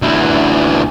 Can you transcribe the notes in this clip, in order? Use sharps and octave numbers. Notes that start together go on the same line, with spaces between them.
D2 E3